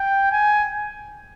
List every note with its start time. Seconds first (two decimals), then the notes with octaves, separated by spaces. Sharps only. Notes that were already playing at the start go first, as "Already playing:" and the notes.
Already playing: G5
0.32 G#5